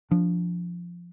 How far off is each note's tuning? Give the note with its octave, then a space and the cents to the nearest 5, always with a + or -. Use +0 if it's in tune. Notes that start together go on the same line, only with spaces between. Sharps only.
F3 +0 D4 -10